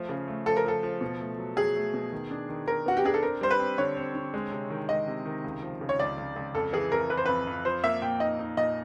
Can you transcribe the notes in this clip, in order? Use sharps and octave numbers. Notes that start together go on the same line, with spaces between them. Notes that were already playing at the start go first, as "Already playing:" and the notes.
Already playing: F3 A3
C#3
A3
F3 A4
A#4
F3 A4
F3
B2
A3
F#3
F#3 G#4
A3
B2
D#3
D4
D#3
D#3 A#4
B3 F#4
G4
D4 G#4
A4
C4 A#4
G3 C5
B4
C4
D3 C#5
C4
D3
G#3
C3
D#3
G#3 D#5
C3
D#3
C#2
F3
C#3
C#5
C#2 D5
C#2
C#2
F2 A4
E3 G#4
F2 A#4
E3 B4
C5
F2 B4
F2
F3 C5
A#3 E5
A#2 G5
D#4 D#5
D#4
A#2 D#5